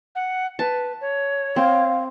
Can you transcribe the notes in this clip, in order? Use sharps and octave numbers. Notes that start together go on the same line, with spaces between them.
F#5
B4 A5
C#5
C4 F5